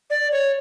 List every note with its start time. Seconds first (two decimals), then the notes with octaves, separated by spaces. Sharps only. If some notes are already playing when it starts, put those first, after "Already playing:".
0.10 D5
0.32 C#5